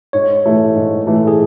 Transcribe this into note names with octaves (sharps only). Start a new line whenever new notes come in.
G#2 C#5
E3 A3
G#2
E3 A3
A4
G#4